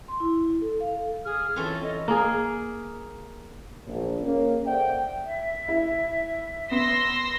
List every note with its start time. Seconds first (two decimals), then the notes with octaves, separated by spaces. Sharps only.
0.08 C6
0.20 E4
0.39 E4
0.61 A4
0.80 F5
0.95 A4
1.25 G#4 F6
1.56 E3 C4 C#4 F4 A4
1.82 A4 D#5
2.08 A#3 G#4
3.87 A#1
4.21 A#3 C#4 G#4
4.66 A4 C5 D5 E5 F#5 G5
5.26 E5
5.68 E4
6.71 B3 C6 E6 A#6